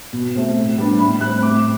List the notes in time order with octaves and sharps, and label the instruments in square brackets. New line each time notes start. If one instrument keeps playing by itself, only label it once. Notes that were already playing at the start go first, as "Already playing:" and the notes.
[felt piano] B2
A3 C4
A2
G3 B3 D4
A2 B5
G3 C4 F#6
A2 D6